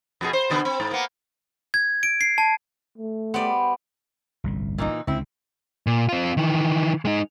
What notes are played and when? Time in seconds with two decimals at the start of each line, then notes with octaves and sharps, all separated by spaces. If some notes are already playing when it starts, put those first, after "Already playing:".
0.21 F2 B2 G#4
0.33 C5
0.50 B2 D3 B3
0.65 C4
0.80 G#2
0.91 A#3 B3
1.74 G#6
2.03 D7
2.21 C7
2.38 A5
2.98 A3
3.34 G3 B3 C5 D5
4.44 G1 C2 A2
4.78 A#2 E3 D#4
5.07 C#2 D3 C4 E4
5.87 A#2
6.09 C4 F4
6.37 D#3 E3
7.05 G#3 D#4